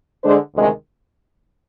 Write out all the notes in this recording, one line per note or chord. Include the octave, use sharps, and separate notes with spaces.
D3 G#3 D4 G#4 C5
D2 C3 D#3 G#3